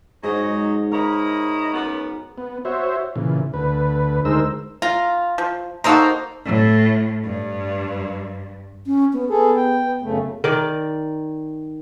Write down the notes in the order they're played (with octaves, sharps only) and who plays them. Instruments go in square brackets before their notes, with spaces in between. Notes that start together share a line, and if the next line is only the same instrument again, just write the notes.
[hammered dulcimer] G#2 [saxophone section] F#3 D#4 D#5
[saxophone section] E4 C#5 D#5 [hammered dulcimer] A#4
[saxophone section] F#2 B3
[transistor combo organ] B3
F#4 C5 C#5 E5
A#2 C#3 E3
D2 B4
D2 G#3 D#4 A#4 C5 E6
[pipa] F4 [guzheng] A#5
[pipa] F3
[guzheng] A#3 D#4 C5 [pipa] F#4 A4 A#4
[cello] A2
G2
[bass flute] C#4
B3
[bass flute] B3 [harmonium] G#4 A4
[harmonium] G5
F#2 C#3 A3
[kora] D#3 D5